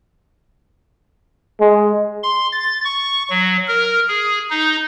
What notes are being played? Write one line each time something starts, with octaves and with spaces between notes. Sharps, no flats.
G#3
C6
A6
C#6
F#3
A#4
G#4
D#4